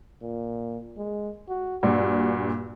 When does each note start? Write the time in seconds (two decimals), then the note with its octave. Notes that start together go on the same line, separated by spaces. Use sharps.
0.22 A#2
0.97 G#3
1.49 F#4
1.83 G2 A#2 F#4